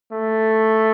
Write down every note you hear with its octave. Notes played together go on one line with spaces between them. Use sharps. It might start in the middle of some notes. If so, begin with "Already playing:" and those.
A3